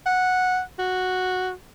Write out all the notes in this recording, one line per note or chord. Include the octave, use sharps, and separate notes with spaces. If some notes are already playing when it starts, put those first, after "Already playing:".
F#5
F#4